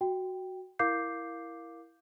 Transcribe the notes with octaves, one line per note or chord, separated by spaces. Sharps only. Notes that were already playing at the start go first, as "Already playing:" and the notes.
F#4 G5
E4 A#4 F5 D6 G6 C7